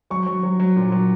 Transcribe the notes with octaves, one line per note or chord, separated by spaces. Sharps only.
F#3 C#6
F#3
F#3
F#3
A#2
F#3